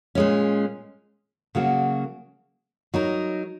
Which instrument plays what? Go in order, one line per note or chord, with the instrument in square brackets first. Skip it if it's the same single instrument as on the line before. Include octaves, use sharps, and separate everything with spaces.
[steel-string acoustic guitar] A#2 G#3 C#4
C#3 F#3 A#3 F#4
F#3 D#4 A#4